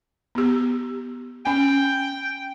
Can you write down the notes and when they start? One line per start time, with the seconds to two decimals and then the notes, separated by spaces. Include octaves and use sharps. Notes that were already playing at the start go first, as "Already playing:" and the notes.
0.35 B3 G4
1.45 C#4 G5 G#5